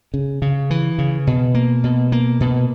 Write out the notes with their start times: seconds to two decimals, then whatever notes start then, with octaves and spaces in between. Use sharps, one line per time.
0.14 C#3
0.42 C#3
0.70 E3
0.98 C#3
1.27 B2
1.55 A#3
1.84 B2
2.12 A#3
2.40 B2